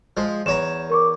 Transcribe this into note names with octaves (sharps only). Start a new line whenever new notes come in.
F3 G#3
E2 C#5 A#5 E7
A#4 C#6 D6